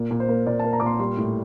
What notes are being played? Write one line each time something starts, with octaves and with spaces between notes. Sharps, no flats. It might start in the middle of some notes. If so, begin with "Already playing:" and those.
Already playing: A#2
A#2
C5
A#3
A#2 D5
A5
A#3
A#5
A#2 D6
C6
G3 C6
A2